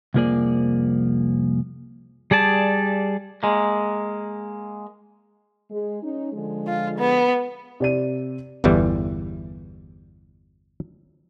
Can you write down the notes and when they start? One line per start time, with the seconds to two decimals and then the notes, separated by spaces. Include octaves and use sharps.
0.14 C2 F2 F3 A#3 G#4 D5
2.31 G3 G#4 D5 A5
3.43 G#3 A#3
5.71 G#3
6.03 C#4 D#4
6.33 D3 F3 G#3
6.67 F4
6.98 B3
7.80 C3 D5 D#7
8.64 G1 E2 E3 G3